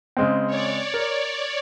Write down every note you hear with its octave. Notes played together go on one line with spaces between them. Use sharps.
C#3 G#3 C4
C#5 D5
A#4